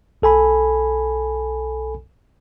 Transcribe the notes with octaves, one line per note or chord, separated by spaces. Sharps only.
B1 A4 G#5 B5